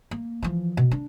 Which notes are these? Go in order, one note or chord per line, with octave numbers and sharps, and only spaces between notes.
A#3
E3 F3
B2
D4